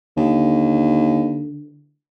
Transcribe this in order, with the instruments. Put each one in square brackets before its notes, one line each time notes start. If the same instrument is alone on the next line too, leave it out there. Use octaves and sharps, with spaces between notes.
[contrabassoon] D#2 [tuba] D3